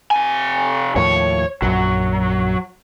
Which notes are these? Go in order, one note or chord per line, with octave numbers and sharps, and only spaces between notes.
C3 G#5
D#2 A2 F3 C#5
A#1 F#2 F#3